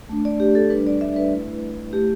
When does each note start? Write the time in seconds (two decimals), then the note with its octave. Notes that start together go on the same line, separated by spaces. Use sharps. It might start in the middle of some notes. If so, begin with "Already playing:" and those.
0.09 A3 D4
0.25 D5
0.40 G4
0.55 A4
0.70 G3 D4 B4
0.87 D5
1.01 E5
1.16 B4
1.32 A3 E4
1.93 A3 E4 G4